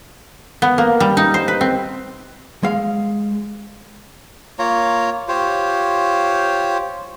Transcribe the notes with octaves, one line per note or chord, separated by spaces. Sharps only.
B3
A#3
G3
D#4
C5
B4
C4
G#3 F5
A#3 F4 C#5 A#5
F4 G4 C5 C#5